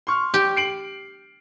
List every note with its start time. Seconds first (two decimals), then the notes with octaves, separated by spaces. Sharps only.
0.07 C6 C#6 F6
0.34 G4 G5
0.57 C7 D7 F#7